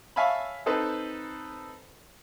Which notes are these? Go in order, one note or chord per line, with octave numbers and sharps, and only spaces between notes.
C#5 E5 F5 G#5 A5 B5
C4 D#4 A4 B4 C5